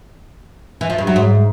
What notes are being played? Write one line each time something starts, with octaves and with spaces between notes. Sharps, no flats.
E3
F3
G2
F#3
G#2